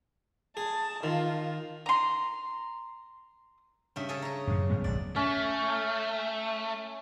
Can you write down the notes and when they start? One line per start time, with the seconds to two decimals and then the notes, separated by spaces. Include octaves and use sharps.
0.57 G#4 A5
1.03 D#3 F4
1.86 A#5 C6
3.96 G2 C#3 E5
4.09 C#4 G#4 A4
4.22 C#5 A#5
4.47 F#2 A2 C#3
4.70 G2 G3 B3
4.84 D#1 B1 G#2 D5
5.16 A3 C#4